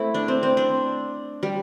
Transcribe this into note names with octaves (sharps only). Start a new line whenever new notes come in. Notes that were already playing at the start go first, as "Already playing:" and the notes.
Already playing: A3 C4 E4
D4
C4
C4
D4
G3